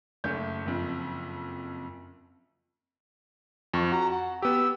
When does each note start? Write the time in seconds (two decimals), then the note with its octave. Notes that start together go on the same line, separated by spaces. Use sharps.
0.24 F#1 A3 C#4 G6
0.66 F#1 F2
3.74 F2 C#6
3.92 F#4 A#5
4.11 F#5
4.42 B3 G4 E6